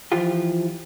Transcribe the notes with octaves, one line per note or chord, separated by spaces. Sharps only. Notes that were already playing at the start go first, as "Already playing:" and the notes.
E3 F3 F4 G4